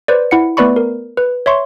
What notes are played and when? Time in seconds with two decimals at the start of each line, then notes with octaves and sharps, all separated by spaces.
0.08 B4 C5 D5
0.31 E4 F#5 C#7
0.57 A3 B3 B4 D5 B5 C#6
0.76 A#4
1.17 B4
1.46 C#5 E5 C6 C#6